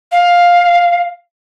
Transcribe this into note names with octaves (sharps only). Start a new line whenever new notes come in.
F5